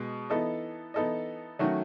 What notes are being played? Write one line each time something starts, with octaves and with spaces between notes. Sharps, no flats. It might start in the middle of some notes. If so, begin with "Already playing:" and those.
Already playing: B2 G#3
E3 B3 D#4 A4 D#5
E3 B3 D#4 A4 D#5
D#3 F#3 A3 C#4 F#4